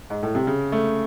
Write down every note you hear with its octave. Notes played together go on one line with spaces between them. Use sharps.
G#2
A2
C3
C#3
A3